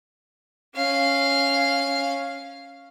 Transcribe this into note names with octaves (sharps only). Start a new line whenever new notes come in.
C#4 F5